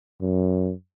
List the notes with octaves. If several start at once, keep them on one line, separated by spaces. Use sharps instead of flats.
F#2